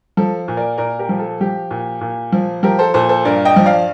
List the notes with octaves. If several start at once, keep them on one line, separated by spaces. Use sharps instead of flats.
F3 A4
A#2
A#4 D5
A#2 A#4 D5
G4 A#4
F3
A4
F3 G4
A#2
A#2
F3
F3 G4 A#4
A4 C5
A#2 A4 C5
A4 C5
G2 A#4 D5
D#5 G5
F3
D5 F5